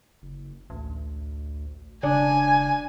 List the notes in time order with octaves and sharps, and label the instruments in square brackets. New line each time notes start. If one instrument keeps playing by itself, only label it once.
[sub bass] F#1
[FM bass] A1 [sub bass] D2
[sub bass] E1 [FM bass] C#3 [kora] D4 [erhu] G#5